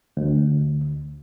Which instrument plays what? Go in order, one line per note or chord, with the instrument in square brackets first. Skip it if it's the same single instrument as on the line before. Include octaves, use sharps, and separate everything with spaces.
[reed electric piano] D2